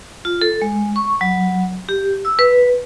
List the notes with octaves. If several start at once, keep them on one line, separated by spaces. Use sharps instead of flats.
F4
A4
G#3
C#6
F#3
G4
E6
B4